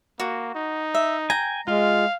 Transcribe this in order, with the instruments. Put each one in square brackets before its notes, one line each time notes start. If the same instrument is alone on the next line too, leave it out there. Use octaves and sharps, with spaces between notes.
[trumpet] A#3 [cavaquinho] F#4
[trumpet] D#4
[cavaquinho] E5
[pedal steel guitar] G5 G#5 [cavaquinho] A#5
[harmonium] G#3 [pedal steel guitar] F4 [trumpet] F5